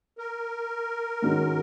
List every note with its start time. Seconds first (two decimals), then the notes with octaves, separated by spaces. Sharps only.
0.18 A#4
1.22 G#2 D#3 G#3 C#4 F#4